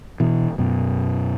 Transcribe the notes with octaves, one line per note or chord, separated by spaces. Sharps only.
B2 E3
F#2 B2